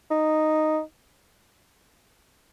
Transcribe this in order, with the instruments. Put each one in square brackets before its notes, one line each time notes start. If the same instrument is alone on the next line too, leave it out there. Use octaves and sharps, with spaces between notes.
[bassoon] D#4